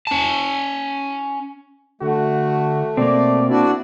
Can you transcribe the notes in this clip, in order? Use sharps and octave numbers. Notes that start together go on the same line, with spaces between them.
C#4 A5
D3 A3 F#4
B2 A#3 C4 D5
D4 E4 F#4 D5